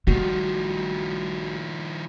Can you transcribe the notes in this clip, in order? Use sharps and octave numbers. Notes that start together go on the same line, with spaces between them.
G#1 D#3 F3 G3 A3 F#4